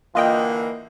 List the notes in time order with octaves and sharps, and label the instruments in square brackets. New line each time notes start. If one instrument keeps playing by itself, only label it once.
[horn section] D3 E3 A#3 [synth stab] F4 D#5 G5